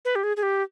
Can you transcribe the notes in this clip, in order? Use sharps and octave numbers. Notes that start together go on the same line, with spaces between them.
B4
G4
G#4
G#4
G4